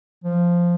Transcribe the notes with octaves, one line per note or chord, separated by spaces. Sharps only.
F3